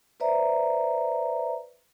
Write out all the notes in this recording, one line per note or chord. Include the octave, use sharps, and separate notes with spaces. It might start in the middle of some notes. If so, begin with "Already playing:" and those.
B4 C5 D5 E5 A#5